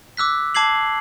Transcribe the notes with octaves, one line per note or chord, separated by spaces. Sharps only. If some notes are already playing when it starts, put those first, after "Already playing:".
D6 E6 F#6 B6
A5 D6 G#6 C7 F#7